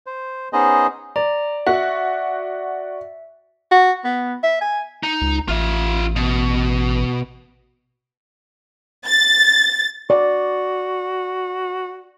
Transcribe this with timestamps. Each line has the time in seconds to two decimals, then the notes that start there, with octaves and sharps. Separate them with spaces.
0.07 C5
0.53 B3 C#4 D#4 G#4 C5 D#5
1.16 D5 A#5
1.67 F#4 E5
3.71 F#4
4.05 B3
4.43 E5
4.61 G#5
5.03 D#4
5.21 C#2
5.48 A1 F4 E5
6.16 B2
9.06 A6
10.10 F#4 D5